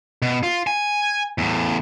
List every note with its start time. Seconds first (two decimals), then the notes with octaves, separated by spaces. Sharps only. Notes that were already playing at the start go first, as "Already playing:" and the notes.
0.22 B2
0.43 F4
0.67 G#5
1.38 E2 A2